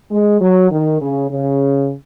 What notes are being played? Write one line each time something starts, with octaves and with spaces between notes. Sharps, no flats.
G#3
F#3
D#3
C#3
C#3